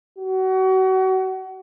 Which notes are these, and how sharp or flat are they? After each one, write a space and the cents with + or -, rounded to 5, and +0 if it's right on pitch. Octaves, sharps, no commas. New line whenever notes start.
F#4 +30